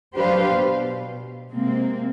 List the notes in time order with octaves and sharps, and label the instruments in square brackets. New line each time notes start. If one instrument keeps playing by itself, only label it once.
[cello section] F#3 D4 G4 B4 C5 F5
B2
C3 G#3 A#3 C4